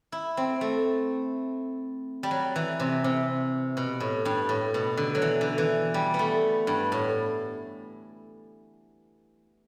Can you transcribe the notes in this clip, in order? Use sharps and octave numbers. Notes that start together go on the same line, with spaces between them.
E4
C4
A3
G3
F#3
E3
C3
C3
B2
A2
G2
A2
B2
D3
F#3
E3
D3
E3
G3
B3
A3
G2
A2